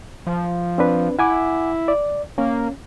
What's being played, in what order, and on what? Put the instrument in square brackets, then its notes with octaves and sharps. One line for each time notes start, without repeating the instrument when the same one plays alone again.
[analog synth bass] F3
[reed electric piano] C4 D4 B4
[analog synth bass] E4 [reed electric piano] F#5 G#5 D6
[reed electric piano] D5
[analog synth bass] A#3 [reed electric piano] C#4